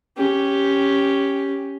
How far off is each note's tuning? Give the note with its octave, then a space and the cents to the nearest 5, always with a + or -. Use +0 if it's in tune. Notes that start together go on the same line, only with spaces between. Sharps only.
C#4 +0 G4 +0